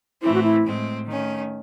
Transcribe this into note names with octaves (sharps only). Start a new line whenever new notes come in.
A2 E3 A3 C4 E4
F#4
E4
A2 G#3 C4
D#3 A3 C#4